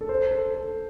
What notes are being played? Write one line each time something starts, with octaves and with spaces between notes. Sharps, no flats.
A4
C5
A4
A4